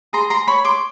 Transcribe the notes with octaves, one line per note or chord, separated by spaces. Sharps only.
G#4 A#5 C6
A#5 C6
C#5 B5 C#6
C6 D6